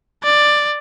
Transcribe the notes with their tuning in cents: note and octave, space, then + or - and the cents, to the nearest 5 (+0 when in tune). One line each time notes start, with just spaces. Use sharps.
D5 +10